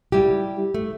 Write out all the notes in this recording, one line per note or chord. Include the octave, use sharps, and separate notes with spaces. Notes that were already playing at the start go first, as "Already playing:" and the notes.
G3 E4 G4
A3